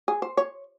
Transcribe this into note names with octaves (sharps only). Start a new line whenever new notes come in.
G#4
C5
C#5